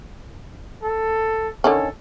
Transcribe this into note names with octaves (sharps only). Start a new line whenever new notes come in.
A4
D3 D#3 C#4 A4